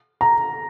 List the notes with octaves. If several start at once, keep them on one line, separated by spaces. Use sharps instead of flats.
A#5